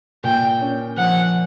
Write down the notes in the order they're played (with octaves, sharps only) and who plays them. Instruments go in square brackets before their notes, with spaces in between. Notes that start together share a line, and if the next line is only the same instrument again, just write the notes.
[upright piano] A#2 [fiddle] G5
[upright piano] C#4
[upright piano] F3 [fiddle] F#5